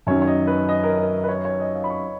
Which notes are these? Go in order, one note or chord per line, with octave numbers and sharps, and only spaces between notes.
F#2 D#3 F#3 C#4 C#5
C#5
D#5
B4
D#5
A#4
A#4
B4
C#5
C#5
D#5
F5
B5
C#6